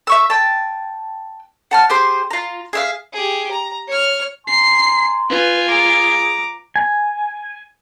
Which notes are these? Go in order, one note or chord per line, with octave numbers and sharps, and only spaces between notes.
E5 C#6 E6
G5 A5
F#5 A5 F6
G4 G#4 C5 C6
F4 A#5
G#4 E5 F5
G4 G#4
A#5
C#5 F6
G#5 A#5 C6 C7
F4 B4 G#5
G#4 A#5 D6
G#5